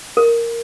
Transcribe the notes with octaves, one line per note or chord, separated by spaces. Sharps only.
A#4